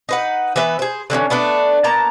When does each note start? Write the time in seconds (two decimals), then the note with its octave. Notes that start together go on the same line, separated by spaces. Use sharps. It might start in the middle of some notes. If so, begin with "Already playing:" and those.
0.09 D#4 B4 F#5
0.56 E3 B3 B4 E5
0.79 G#4 C5
1.10 D3 E3 C4 C#4
1.30 A3 B3 D4 B4
1.84 A#3 B3 A5 A#5